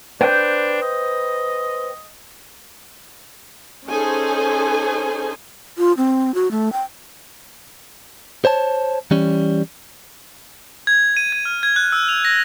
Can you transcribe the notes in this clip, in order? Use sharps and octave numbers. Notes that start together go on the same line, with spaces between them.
D4 B4 C5 G5
D#5
C#4 D#4 G#4 A4 C5 G#5
F4
C4
F#4
A3
G5
C5 C#5 A5
E3 G3 C#4
G#6
D#7
G#6
F6
G#6
F#6
E6
F7
A#6